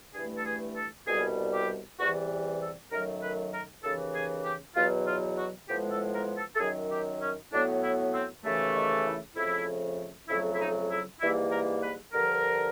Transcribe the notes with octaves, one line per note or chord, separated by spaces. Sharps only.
G2 E3 A3 G#4
A4
G#4
A4
C2 B2 G3 G#4
G4
E2 C3 E3 G3 F#4
A4
F#2 D#3 F#3 A3 A#4
B4
A#4
D#2 C#3 E3 A4
G#4
G4
E2 B2 F#3 F4
F4
F#4
A2 F3 G#3 B3 G4
A4
A#4
A4
A4
F#2 D#3 F#3 G#4
G4
C#4
A2 F#3 B3 D4
E4
C4
D#2 C#3 E3 A3
D#4
E4
F2 C#3 F3 A3 E4
F2 C#3 F#3 A3 E4
E4
D#4
E4
G#2 E3 G3 A#3 E4
A#4
B4
G2 D3 F3 A#4